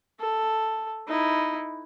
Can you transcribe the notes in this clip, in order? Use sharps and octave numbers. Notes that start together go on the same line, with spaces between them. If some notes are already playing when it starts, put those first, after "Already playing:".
A4
D#4 E4